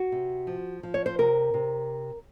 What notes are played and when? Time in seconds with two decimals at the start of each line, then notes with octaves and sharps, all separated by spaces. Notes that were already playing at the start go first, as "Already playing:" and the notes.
Already playing: F#4
0.12 C3
0.47 F3
0.83 F3
0.94 C#5
1.06 C5
1.18 C3 A#4
1.54 C3